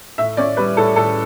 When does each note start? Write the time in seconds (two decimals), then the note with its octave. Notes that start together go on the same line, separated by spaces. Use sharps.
0.18 A2 E5
0.37 C#4 D5
0.57 G3 B4
0.77 A2 A4
0.96 A2 A4